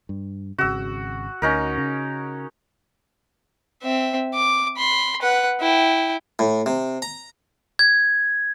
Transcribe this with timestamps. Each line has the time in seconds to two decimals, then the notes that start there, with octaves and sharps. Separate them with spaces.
0.09 G2
0.58 G#1 C#3 F#4 E6
1.42 D2 C#4 D#4 A#4
1.78 C#3
3.83 C4 E5
4.34 D6
4.77 B5 C6
5.22 B4 F#5
5.61 E4 G5
6.39 A2
6.66 C3
7.02 A#5
7.79 G#6